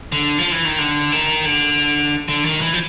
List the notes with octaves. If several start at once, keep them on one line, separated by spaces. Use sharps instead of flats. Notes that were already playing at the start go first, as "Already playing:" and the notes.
D3
F3
E3
D#3
D3
D#3
D3
D3
D#3
E3
F3